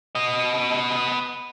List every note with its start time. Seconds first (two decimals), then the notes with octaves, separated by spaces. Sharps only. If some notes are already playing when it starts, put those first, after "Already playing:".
0.15 B3 D#5